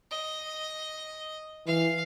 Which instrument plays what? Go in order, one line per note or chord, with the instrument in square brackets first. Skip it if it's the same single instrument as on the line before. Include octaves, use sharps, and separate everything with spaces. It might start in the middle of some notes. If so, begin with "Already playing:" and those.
[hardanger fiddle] D#5
[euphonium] E3 [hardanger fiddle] F5